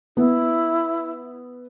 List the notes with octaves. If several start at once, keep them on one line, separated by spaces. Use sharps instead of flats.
B3 E4